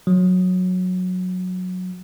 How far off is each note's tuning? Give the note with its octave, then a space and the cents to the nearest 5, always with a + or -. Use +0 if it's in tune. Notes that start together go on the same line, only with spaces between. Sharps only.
F#3 -15